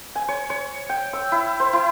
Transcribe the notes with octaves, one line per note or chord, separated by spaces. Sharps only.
G#5
C#5
C#5
G5
E6
E4
C5
E4